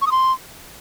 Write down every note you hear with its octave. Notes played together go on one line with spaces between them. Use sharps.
C#6
D#6
C6